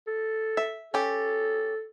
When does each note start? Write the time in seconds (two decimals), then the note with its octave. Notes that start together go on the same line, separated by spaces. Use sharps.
0.07 A4
0.57 E5
0.94 C#4 G4 A4